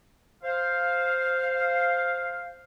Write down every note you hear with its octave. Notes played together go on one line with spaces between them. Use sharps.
C5 F5